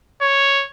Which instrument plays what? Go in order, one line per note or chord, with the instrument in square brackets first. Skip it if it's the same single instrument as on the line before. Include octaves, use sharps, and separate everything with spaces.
[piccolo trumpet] C#5